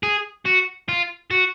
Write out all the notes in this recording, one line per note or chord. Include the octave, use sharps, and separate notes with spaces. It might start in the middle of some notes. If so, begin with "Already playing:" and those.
G#4
F#4
F4
F#4